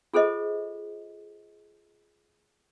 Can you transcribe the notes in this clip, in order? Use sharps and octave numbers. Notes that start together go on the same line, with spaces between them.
F4 G#4 A4 C5 D#5